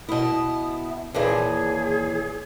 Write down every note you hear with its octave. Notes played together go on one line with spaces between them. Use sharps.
B2 E4 D#6
D#2 A#2 E3 G#4